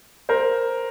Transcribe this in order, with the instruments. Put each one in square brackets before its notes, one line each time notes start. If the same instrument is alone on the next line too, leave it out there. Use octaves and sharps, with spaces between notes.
[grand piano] A#4 C5